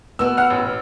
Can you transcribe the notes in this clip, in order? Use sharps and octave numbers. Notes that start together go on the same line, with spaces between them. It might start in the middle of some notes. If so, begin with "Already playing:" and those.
B2 B3 E6
F#5 F6
A1